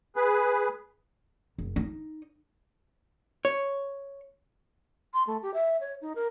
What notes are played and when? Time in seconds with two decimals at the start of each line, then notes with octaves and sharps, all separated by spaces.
0.16 G#4 B4
1.58 F#1
1.76 D#4
3.45 C#5
5.14 C6
5.27 A3
5.43 G4
5.54 E5
5.81 C#5
6.01 D#4
6.15 A#4